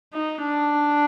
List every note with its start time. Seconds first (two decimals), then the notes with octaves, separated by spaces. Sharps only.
0.13 D#4
0.44 D4